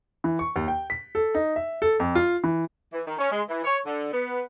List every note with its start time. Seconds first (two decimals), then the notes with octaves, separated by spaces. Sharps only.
0.24 E3
0.39 C#6
0.56 D#2
0.68 G5
0.90 B6
1.15 A4
1.35 D#4
1.56 E5
1.82 A4
2.00 F2
2.15 F4
2.44 E3
2.93 E3
3.07 D#3
3.19 C#4
3.32 G#3
3.49 E3
3.64 C#5
3.86 D3
4.13 B3